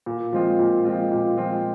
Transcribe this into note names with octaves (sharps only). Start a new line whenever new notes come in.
A#2
F3 G#3 C4 F4
A#2
F3 G#3 C4 F4
A#2
F3 G#3 C4 F4